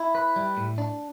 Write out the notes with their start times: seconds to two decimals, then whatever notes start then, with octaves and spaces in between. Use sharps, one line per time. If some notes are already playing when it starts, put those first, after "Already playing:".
Already playing: E4
0.15 B4
0.36 G3
0.57 A2
0.78 D4